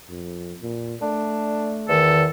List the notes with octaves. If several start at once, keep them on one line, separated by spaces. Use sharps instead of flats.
F2
A#2
A3 D4
E2 D#3 A4